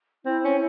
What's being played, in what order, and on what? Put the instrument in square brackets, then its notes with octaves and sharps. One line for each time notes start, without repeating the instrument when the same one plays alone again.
[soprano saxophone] C4 [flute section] E4
[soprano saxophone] C#4